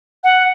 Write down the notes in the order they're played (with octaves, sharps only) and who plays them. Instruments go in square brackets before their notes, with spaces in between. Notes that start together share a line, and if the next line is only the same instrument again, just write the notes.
[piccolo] F#5